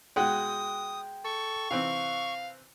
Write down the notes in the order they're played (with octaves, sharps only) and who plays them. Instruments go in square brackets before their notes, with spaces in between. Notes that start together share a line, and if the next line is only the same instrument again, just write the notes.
[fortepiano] B2 G#3 F#5 [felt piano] G5 [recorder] D#6
[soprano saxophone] A4 [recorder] C#6
[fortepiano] C3 E3 C4 [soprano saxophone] F5